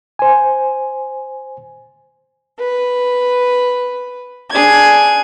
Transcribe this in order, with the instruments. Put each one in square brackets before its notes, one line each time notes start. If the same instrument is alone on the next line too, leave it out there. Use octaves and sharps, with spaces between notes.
[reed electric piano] C5 G#5
[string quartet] B4
D4 G#4 G#6